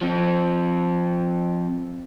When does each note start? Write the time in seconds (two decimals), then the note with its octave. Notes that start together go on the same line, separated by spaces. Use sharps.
0.02 F3 C4